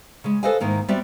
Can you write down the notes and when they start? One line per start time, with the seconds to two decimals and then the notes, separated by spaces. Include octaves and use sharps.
0.24 C#3 G#3
0.43 A4 B4 C5 D#5 F5 G#5
0.60 G#2 D#3 A#3 E4
0.88 G3 B3 C4 F#4 D5 E5